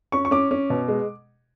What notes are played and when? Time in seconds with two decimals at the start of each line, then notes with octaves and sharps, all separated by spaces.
0.12 C#4 C#6
0.25 C#6
0.31 C#4 D6
0.51 C#4
0.70 B2
0.88 G#3